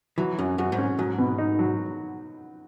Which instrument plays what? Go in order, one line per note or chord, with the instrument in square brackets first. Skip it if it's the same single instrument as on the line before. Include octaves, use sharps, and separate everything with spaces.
[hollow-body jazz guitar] E3 [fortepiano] F#3
[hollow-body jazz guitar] F#2 [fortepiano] C#4
[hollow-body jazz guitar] F#2 [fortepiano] F#4
[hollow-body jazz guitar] G#2
[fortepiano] C#4
[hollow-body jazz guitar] G#2 [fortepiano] F#3
[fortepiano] B2
D#4
F#3